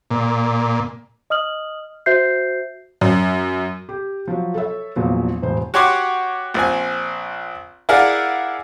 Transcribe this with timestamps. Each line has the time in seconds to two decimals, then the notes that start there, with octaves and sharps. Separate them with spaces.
0.11 A#2
1.30 D#5 D#6 F6 F#7
2.06 F#4 C5 E5 G6 C7
3.01 F#2
3.89 G4
4.28 F3 F#3
4.54 A4 C#5 E5
4.96 A#1 E2 A#2 F3 F#3
5.42 E1 A1 C5
5.74 F#4 G4 C#5 F#5 C6 D6
6.54 A#1 C4 G#5
7.89 E4 G#4 A#4 D5 F5 F#5